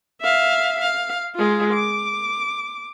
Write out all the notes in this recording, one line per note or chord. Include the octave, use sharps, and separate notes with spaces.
E5 F5
F5
G#3 F4
D6